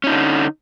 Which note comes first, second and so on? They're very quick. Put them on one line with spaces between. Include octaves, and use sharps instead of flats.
C#4 D#4 D3